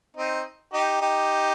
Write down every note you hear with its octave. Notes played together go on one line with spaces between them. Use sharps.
C4 D#4
D#4 G4
D#4 G4